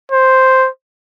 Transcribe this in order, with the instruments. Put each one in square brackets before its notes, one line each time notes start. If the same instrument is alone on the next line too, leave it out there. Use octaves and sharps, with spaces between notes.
[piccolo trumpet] C5